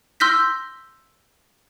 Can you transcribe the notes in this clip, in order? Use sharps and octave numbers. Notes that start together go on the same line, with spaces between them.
C6 E6 F6 G6 A#6 B6